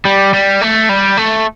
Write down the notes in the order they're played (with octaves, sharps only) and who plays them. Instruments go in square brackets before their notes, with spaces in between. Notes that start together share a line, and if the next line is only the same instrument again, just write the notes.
[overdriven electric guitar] G3
G3
A3
G3
A3